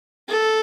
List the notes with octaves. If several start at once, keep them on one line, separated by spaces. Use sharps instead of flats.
A4